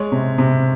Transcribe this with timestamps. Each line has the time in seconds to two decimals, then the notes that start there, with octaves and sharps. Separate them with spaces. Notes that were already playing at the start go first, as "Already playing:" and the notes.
Already playing: G#3 C#5
0.12 C3
0.38 C3